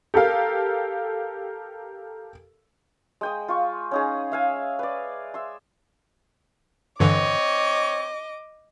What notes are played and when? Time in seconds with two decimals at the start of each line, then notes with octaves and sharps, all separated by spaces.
0.14 G4 A4 A#4 F5
3.21 G#3 G5 D#6
3.48 F4 C#6
3.91 C#4 D#4 G#4
4.32 E5 F5 G#5
4.79 B4 D5
5.34 E5 C6
7.00 G2 D3 E3 C4 C#5 D#5 D6